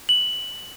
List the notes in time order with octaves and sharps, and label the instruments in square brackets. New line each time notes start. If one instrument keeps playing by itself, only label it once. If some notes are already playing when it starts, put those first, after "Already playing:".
[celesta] F#7